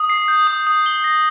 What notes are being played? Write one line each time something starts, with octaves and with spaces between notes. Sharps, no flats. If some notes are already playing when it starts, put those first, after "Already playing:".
Already playing: D#6
C7
G6
D#6
D#6
G7
A#6